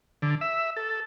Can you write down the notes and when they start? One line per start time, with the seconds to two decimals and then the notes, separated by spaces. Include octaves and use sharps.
0.22 D3
0.41 E5
0.77 A4